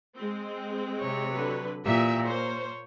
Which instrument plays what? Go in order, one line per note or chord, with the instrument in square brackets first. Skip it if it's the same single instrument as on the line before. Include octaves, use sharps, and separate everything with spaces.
[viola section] G#3 C4
[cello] C3 C#5
[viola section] D3 F#3 B4
[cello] A#2 E3 [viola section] G4 E5
[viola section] A#3 C5 [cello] C#5